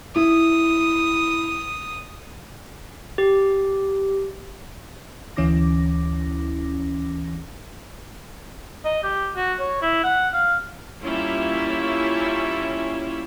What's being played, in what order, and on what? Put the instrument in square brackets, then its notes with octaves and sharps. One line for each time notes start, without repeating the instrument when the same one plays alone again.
[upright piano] E4 [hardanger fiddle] D#6
[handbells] G4
[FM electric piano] D2 E3 C#4 E4 D6 A#6
[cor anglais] D#5
G4
F#4
C#5
E4
F#5
F5
[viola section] G3 A#3 C#4 E4 F4 E5